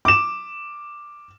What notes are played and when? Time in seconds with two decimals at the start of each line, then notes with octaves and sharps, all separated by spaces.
0.05 D6 E7